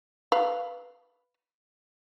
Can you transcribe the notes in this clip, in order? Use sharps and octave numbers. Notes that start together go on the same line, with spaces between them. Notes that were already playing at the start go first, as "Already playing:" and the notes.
B4 F5